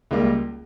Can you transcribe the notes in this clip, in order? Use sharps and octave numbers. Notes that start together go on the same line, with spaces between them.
C#2 C#3 G3 A#3